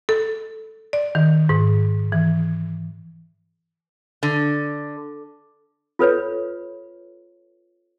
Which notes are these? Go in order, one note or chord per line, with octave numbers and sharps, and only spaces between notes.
A4
D5
D#3
G#2
E3
D3
F4 A4 B4 C#5